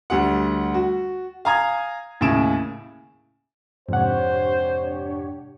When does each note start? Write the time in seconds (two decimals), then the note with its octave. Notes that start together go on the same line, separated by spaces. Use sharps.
0.10 D2 G3 F#5
0.74 F#4
1.45 F5 G#5 A#5 D#6 G#6
2.21 D#2 A2 C#3 G#5 D7 E7
3.89 F2 G#2 C3 D4 G4 C5 C#5 F#5